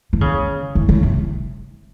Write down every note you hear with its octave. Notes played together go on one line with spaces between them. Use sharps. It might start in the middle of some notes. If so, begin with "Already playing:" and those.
E3
C#3
E3
C#3
C3